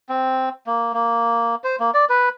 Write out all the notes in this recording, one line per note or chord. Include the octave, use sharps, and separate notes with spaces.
C4
A#3
A#3
C5
A#3
D5
B4